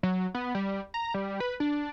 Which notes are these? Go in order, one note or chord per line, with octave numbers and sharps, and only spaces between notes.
F#3
B3
G3
A#5
G3
B4
D4